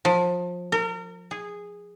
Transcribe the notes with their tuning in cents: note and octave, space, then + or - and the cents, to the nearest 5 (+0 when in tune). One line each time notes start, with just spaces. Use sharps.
F3 +25
A#4 -35
G#4 -10